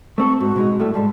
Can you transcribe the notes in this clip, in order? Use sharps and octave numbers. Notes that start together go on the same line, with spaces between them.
A3 C4 A4 C#6
G#2 F#4
B2 G#3 D#4
A2 G3 A3 A4
G#2 G3 G#3 A5